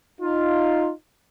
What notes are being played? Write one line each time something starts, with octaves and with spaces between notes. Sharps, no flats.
D#4 F4